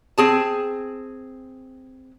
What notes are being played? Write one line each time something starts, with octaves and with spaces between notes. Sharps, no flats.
C4 G#4 A5